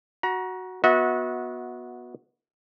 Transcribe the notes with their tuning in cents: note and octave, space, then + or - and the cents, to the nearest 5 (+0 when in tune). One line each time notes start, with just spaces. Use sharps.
F#4 +0 A#5 +35
B3 -15 F#4 -20 E5 -45